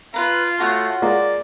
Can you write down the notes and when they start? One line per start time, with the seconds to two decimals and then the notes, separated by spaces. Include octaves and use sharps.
0.14 F4 B4 A#5
0.60 A3 F#4 C#5 F#5
1.02 G#3 A#3 F4 D5